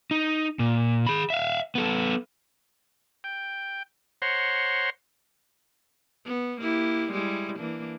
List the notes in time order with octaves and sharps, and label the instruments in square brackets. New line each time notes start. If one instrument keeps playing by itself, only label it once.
[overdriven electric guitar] D#4
A#2
G#4 B5
E5 F5
B3 A4
[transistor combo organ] G5
C5 C#5 F#5 A#5 C6
[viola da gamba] B3
A#3 E4 G4
G3 G#3 E4
E3 A#3 D4